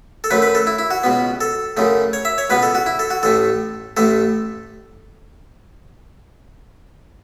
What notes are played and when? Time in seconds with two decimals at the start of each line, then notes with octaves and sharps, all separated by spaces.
0.24 A4
0.31 F#2 F#3 A3 B4
0.42 B4
0.55 A4
0.67 E4
0.78 E4
0.91 F#4
1.03 C#2 B2 B3
1.41 A4
1.77 F#2 C#3 A3
2.13 C#5
2.25 E5
2.38 C#5
2.50 C#2 B2 B3 B4
2.63 A4
2.75 F#4
2.86 E4
2.99 A4
3.10 F#4
3.23 A1 A2 A3 A4
3.97 A1 A2 A3 A4